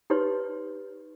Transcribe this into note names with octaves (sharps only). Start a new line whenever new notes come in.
D#4 G4 B4 C#5 C6